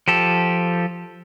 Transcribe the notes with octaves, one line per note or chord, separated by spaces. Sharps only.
F3 G4 A4